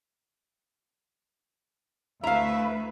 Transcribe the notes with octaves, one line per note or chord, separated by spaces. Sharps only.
D2 A3 E4 B4 E5 F5 A#5